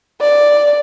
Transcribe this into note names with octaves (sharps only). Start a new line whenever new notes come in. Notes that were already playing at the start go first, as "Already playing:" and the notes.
D5